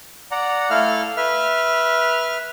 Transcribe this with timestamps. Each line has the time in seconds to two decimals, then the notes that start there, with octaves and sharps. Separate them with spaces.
0.31 D5 F#5 A#5
0.70 A3 E4 A4 F5 F6
1.17 B4 E5 F6